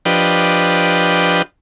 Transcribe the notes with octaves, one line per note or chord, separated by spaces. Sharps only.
F3 D4 G4 B4 D#5